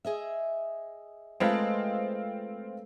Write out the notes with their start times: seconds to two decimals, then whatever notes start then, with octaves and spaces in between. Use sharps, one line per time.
0.05 G#4 D#5 E5
1.40 G#3 A3 C4 F4 B4